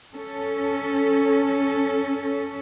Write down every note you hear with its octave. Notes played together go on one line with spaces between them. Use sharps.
C#4 A4